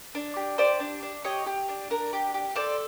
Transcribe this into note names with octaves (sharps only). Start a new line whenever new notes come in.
D4
G4
G4 C5 D5
D4
D4
G4 C#5 D#5
G4
D4
D4 A#4
G4
G4
A4 C5 D5